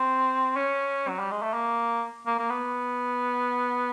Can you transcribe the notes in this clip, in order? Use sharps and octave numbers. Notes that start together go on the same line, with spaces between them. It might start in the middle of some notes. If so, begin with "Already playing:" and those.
Already playing: C4
C#4
F#3
G3
G#3
A3
A#3
A#3
A#3
B3